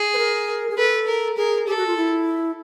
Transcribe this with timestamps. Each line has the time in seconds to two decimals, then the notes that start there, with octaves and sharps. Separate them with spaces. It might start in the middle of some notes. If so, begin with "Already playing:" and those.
Already playing: G#4
0.14 B4
0.18 A#4
0.70 G#4
0.77 A4 B4
1.07 A#4
1.37 G#4 A#4
1.67 G4 A4
1.78 F#4
1.87 F4
1.97 E4